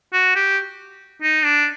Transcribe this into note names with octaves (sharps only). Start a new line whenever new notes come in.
F#4
G4
D#4
D4